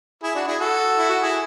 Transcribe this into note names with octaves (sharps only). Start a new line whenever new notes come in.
E4 G#4
D4 F#4
E4 G#4
F#4 A4
E4
F#4
E4 G#4